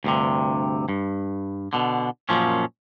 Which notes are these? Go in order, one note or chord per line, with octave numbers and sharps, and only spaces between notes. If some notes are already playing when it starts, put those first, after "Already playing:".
D2 G2 C3
G2
B2 D3
F#2 A#2 F3 C#4